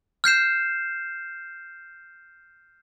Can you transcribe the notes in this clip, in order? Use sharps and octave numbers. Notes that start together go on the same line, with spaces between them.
F6 G6 C7 E7